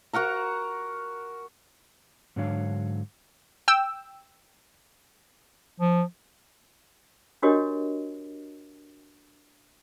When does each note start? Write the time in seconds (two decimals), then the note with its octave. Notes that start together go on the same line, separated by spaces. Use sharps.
0.13 F#4 A#4 F#5 A#5
2.36 G#2 D3 F#3 D4 C#5 F5
3.68 G5 E6
5.80 F3
7.42 D4 F#4 G4 A#4 C#5 D#5